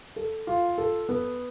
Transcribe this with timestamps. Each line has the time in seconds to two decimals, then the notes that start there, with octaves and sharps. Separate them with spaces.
0.16 A4
0.47 F4
0.78 A4
1.09 B3